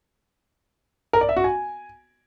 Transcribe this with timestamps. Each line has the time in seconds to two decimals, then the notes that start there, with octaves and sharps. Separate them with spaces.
1.13 A#4
1.21 D5
1.29 E5
1.36 F#4
1.44 G#5